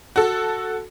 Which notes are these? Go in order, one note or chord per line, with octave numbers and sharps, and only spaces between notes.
F#4 A4